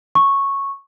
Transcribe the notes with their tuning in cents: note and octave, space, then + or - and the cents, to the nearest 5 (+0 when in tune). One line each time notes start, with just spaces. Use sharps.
C#6 -5